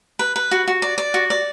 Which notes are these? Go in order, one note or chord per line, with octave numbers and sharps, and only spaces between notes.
B4
B4
F#4
F#4
D5
D5
F#4
D5